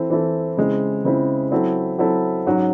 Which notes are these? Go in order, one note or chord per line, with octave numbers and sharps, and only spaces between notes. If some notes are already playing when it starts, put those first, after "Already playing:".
Already playing: E3 C4 E4 A4
E3 C4 E4 A4
C#3 G#3 C4 E4
C#3 G#3 C4 E4
F#3 C4 E4 A4
F#3 C4 E4 A4
G#2 F#3 C#4